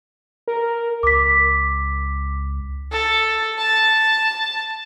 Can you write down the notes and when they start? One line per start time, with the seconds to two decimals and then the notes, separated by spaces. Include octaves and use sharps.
0.48 A#4
1.03 C#2 D6 B6
2.92 A4
3.58 A5